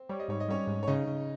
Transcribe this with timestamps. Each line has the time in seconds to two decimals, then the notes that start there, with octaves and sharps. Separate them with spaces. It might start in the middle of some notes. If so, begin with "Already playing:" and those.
Already playing: C4
0.09 G3 C#5
0.19 D#5
0.28 G#2 C#5
0.40 D#5
0.48 G3 C#4 C#5
0.67 G#2
0.83 C#5
0.87 C#3 D#4 D#5
1.08 C#3